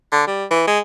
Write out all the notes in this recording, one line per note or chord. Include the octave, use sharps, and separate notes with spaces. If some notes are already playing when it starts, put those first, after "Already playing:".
D3
G3
E3
G#3